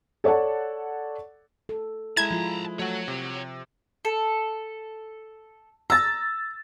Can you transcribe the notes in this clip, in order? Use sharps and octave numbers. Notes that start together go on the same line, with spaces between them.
A4 C#5 D5 F#5 A5
A4
G#3 E4 A5 A#5 G#6
F3 F4
F#3 A3 C#5 F#5
C3
A4
A#5 E6 A6